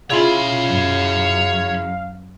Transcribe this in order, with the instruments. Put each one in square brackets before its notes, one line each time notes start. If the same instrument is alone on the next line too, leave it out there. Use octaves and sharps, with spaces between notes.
[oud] C#3 E4 F4 [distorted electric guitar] C#5 B5 [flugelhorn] F5
[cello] F#2 F#3